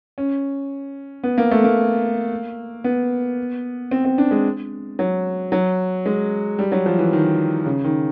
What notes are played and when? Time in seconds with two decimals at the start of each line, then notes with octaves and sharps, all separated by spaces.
0.18 C#4
1.23 B3
1.38 A#3
1.51 A3
1.64 A#3
2.84 B3
3.91 C4
4.05 C4
4.18 D4
4.31 G#3
4.99 F#3
5.52 F#3
6.06 G#3
6.59 G3
6.72 F#3
6.86 F3
6.99 E3
7.13 D#3
7.66 C#3
7.84 D#3